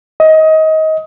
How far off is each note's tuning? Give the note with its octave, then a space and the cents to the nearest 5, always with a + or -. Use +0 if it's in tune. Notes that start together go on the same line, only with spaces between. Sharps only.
D#5 +25